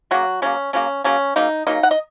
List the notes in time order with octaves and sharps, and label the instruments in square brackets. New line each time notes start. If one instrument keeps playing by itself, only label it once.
[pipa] C#3 F#3 A#3 F#4
C#3 F#3 A#3 C#4
C#3 F#3 A#3 C#4
C#3 F#3 A#3 C#4
C#3 F#3 A#3 D#4
C#3 F#3 A#3 D#4 D#5
F#5
D#5